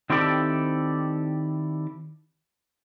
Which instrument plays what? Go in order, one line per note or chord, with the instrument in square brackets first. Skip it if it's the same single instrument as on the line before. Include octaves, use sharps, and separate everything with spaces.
[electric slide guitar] D#3 C4 E4 G4 A4 D5